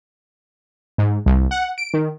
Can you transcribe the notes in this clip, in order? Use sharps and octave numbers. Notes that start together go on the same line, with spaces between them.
G#2
C2
F#5
D7
D#3